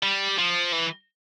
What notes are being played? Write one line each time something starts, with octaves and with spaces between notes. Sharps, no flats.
G3
F3
E3